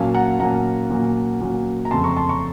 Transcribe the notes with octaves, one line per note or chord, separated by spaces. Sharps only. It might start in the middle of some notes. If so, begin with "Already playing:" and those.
Already playing: A#2 F#3 A#3 C#4 F5 A5
F#5 A#5
A#2 F#3 A#3 C#4 F#5 A#5
A#2 F#3 A#3 C#4
A#2 F#3 A#3 C#4
A#5
F2 C#3 A3 C4 A5 C6
A#5 C#6
A5 C6
A#5 C#6